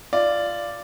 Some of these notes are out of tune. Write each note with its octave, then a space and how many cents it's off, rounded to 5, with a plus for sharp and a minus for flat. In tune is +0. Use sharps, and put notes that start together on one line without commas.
F4 -15 D5 +0